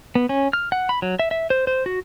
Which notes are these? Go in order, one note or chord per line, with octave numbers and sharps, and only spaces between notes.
B3
C#4
F6
F#5
B5
F#3
E5
E5
C5
C5
F#4